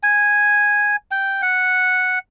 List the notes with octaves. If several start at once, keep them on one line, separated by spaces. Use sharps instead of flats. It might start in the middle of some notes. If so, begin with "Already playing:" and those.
G#5
G5
F#5